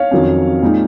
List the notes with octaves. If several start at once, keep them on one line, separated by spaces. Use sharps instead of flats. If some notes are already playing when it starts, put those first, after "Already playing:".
Already playing: C#5 F5
F2 D#3 F#3 C#4
A#2 G#3 C4 D#4